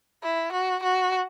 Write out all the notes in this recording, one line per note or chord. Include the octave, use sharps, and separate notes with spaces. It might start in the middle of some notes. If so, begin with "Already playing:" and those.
E4
F#4
F#4